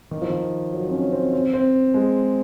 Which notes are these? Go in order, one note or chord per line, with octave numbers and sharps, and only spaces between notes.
D#3
F3
D#3
F#3
C4
C#4
C4
C4
C4
G#3